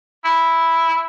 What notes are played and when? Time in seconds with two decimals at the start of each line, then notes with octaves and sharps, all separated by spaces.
0.24 E4